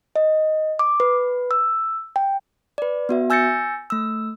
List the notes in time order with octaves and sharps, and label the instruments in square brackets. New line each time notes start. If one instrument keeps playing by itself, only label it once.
[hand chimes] D#5
D6
B4
E6
G5
B4 D5
B3 F#4 E5
G#5 E6 G6 A6 A#6 C#7
A3 E6